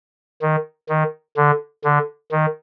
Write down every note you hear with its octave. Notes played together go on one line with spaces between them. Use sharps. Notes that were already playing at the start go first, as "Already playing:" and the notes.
D#3
D#3
D3
D3
D#3